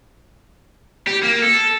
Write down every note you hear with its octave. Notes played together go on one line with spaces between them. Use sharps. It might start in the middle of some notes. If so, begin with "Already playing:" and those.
G4
A#3
A4